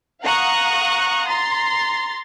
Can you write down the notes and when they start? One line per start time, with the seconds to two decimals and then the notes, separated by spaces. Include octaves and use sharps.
0.22 F5 F#5 A#5 C#6 D#6 F#6
1.28 A#5 C6 A6